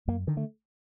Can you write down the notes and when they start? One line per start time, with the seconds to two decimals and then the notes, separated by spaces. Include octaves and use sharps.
0.08 F#2 A#3
0.27 D3 D#3
0.37 A3